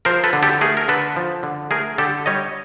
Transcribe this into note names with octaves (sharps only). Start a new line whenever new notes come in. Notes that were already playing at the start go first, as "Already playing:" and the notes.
F3 A#4 C5
A4 B4
D3
G4 A4
A3 G#4 A#4
A#4
D3 A4 B4
F3
D3
A3 G#4 A#4
D3 G4 A4
G3 C#5 D#5